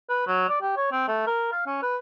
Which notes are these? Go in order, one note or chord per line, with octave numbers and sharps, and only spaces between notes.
B4
F#3
D5
G4
C#5
C4
A3
A#4
F5
C#4
B4